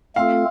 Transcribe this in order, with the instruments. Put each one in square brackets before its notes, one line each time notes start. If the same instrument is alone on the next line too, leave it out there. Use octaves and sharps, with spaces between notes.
[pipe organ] A3 C4 F4 A4 [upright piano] F5